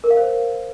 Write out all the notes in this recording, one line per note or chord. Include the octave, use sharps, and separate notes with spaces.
A#4
F5
C5